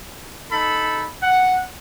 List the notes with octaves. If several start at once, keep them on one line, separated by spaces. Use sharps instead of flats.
D#4 A4 B5
F#5